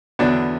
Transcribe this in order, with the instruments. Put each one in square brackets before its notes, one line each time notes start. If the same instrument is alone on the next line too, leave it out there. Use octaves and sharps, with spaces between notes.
[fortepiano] E2 D3 F#3 B3 D4